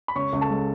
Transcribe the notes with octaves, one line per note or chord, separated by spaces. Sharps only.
B5
C#2 C#5 C#6
C#2
A4 A5
G#3